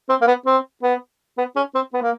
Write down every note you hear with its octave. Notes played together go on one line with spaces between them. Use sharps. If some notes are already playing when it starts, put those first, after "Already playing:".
C4
A#3
B3
C4
B3
B3
C#4
C4
B3
A#3